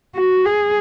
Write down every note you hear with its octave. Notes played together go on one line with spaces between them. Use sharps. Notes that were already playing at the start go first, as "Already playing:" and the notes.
F#4
G#4